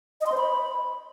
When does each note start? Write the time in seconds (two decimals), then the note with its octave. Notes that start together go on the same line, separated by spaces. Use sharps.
0.21 D#5
0.26 C6
0.32 C5
0.37 B5